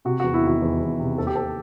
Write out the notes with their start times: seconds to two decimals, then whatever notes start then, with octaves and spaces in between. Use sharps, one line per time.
0.05 C3 F#4
0.20 E2 F#4
0.34 E4
0.43 D#3 F#4
0.62 E2
0.81 E2
1.00 C3
1.18 D#2 A4
1.27 G4
1.36 A4